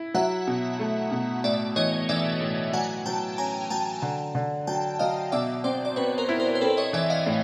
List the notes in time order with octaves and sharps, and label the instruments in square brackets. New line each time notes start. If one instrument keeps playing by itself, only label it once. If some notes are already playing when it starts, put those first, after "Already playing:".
Already playing: [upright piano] E4
[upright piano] F#3 [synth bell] E5 F#5
[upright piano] B2
A3
B2
[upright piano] A2 [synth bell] D5 E5
[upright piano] E3 [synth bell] C#5 D#5
[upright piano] E3 [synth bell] D5 E5
[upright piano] A2
[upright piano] F#3 [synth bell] F#5 G#5
[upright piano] F#3 [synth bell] G5 A5
[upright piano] C#4 [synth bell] G#5 A#5
[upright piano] F#3 [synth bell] G5 A5
[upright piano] D3
D3
[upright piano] F#3 [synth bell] G5 A5
[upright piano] F#3 [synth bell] D#5 F5
[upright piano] B2 [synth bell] D5 E5
[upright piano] C4 [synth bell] C5 D5
[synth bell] D5
[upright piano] C4 [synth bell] B4 C#5
[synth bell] A#4 C5
[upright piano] E4
[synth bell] A#4 C5
C5
[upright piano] C4 [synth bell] A4 B4
[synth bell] C#5 D#5
[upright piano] E3 [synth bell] D5 E5
[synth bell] D#5 F5
[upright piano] A2